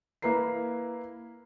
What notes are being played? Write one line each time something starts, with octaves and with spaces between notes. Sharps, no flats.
A#3 E4 B4 A#5 C7